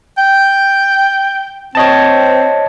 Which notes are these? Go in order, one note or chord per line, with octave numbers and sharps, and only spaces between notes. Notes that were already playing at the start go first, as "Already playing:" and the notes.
G5
C4 C#5 D#5 A5